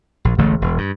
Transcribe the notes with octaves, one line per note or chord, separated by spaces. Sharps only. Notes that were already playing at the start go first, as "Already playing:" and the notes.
A#1
E1 A1 D3 A3
E1
G2